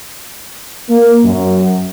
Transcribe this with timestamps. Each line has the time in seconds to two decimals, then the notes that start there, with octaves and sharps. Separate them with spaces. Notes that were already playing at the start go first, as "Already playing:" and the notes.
0.89 A#3
1.24 F#2